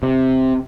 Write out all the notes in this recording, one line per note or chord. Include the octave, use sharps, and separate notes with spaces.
C3